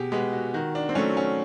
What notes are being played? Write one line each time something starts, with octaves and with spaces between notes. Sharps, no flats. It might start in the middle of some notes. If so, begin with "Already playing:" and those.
Already playing: B2 G4 G#4
G#3 B3 G4
F#4
D#3 F#4
D4
C4
F#3 A3 C#4
C#4